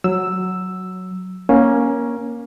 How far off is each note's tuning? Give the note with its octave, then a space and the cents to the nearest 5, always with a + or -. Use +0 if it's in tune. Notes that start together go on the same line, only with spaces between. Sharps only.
F#3 +0 E6 +0
A#3 +20 C#4 +0